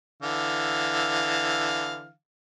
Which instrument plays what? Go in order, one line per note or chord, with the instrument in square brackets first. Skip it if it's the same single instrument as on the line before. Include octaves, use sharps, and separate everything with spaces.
[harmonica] D3 E3 F5